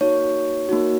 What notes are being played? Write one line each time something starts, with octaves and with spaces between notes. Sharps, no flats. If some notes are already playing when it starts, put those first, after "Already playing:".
A#3 D#4 F#4 C#5
A#3 D#4 F#4